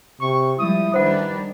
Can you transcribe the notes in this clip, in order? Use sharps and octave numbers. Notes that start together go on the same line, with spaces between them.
C3 C#6
F3 G3 G#3 E4 D#6
D#3 G3 D4 B4 C5 F#5